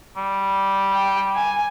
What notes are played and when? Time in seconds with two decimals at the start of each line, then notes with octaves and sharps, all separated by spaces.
0.17 G3
0.93 G5
1.35 G#5